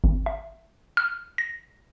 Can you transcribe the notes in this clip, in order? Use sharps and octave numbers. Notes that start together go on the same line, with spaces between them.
G#1
E5
F6
A#6